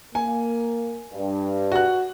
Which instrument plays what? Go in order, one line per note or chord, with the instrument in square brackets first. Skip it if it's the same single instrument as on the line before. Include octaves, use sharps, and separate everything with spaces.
[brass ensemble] A#3 [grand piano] G#5
[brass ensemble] G2
[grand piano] F#4 F#6